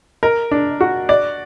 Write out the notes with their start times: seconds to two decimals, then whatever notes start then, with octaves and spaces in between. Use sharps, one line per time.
0.23 A#4
0.51 D4
0.81 F#4
1.09 D5